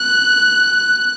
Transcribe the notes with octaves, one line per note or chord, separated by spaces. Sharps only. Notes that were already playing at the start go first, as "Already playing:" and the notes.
Already playing: F#6